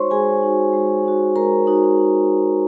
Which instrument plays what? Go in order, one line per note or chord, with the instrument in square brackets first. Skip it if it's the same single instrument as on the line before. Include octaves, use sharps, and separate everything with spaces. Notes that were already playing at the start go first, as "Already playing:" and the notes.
Already playing: [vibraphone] G#3 D#4 F#4 C5 C#5 C6 C#6
G#3 G#4 G#5
D#4 F#4
G#3
D#4 F#4
G#3 A#4 A#5
D#4 F#4